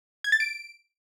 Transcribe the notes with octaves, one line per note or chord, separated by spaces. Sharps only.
G#6
A6
D7